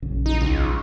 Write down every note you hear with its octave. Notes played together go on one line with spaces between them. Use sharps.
A#1 F#2 C#3
D#4
C#2